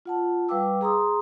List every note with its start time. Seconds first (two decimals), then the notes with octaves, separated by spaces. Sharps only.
0.06 F4 F#5 A5
0.49 G3 B4 F5 G5 D6 E6
0.81 G#4 A#5 C6 D#6